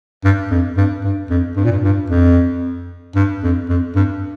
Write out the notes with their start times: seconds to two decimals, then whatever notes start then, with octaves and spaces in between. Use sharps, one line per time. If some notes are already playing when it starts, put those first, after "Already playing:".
0.24 G2
0.51 F2
0.77 G2
1.04 G2
1.30 F2
1.56 G2
1.64 A#2
1.72 G2
1.84 G2
2.10 F2
3.15 G2
3.43 F2
3.69 F2
3.95 G2